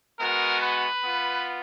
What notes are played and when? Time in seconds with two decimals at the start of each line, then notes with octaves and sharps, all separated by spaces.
0.19 G#3 B3 F#4 A#4
0.61 B4
1.04 B3 F4